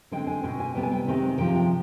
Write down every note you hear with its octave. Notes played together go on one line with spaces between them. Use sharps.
D3 G#3 C4 G5
G#5
B2 G#3 C4 G5
G#5
C3 G3 B3 G5
G#5
G5
C3 D#3 G#3 C4
C3 F3 G#3 G5
G5